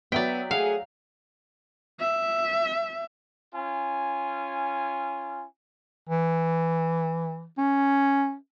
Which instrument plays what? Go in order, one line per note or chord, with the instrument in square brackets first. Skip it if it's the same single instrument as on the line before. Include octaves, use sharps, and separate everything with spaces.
[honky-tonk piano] F#3 E5 B6 [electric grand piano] B3 [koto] D5 G5
[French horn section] A3 F#4 G#4 [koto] F5 [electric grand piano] F#5
[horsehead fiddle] E5
[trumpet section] C#4 F4 G#5
[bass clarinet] E3
C#4